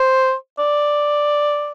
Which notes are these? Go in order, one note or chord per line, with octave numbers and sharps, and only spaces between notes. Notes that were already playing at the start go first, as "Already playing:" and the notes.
Already playing: C5
D5